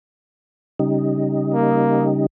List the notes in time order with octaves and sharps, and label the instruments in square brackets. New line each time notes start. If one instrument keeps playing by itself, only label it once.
[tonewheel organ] C#3 G3 D#4
[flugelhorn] A#3